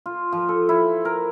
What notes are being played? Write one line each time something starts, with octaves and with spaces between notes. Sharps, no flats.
F4
F3
A4
E4
A#4